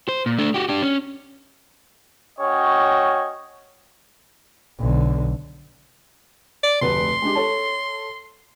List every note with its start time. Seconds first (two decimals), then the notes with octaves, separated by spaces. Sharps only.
0.09 C5
0.26 A#2
0.39 A3 D4
0.54 F#4 G4
0.69 D4 G4
0.83 C#4
2.39 C#4 F#4 C#5 D#5 G5
4.80 B1 D3
6.64 D5
6.81 F1 D2 B4 C6
7.22 G#3 D4 G4
7.35 A4 C#5 A5